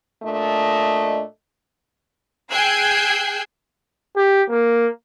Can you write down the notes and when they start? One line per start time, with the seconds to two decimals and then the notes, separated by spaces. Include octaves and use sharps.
0.23 A#2 A3 D4 D#5
2.50 G#4 G5 E6 F#6 G#6 C7
4.16 G4
4.49 A#3